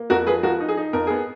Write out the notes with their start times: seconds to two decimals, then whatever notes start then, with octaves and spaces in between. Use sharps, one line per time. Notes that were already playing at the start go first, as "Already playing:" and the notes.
Already playing: A#3
0.10 F2 F#4 A#4
0.27 F3 G#4 B4
0.43 F3 F#4 A#4
0.60 D#4
0.68 G#4
0.77 D#4
0.93 F2 A#4
1.07 B3 G#4